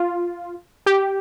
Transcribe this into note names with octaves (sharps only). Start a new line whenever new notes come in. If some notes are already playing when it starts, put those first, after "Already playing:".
Already playing: F4
G4